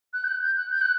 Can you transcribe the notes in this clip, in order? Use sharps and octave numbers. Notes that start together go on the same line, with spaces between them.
F#6
G6
F#6
G6
F#6
G6
F#6